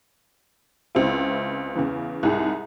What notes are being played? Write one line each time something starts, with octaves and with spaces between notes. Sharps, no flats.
C#2 C4 E4
E2 C#3 E3
C2 G#2 G#4